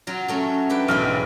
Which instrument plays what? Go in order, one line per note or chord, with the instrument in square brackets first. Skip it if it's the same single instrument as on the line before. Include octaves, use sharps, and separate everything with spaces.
[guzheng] F#3 F4
F#3 A3 C#4
D4 B4 G5
[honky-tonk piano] B1 F6 [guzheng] E2 G#2 G5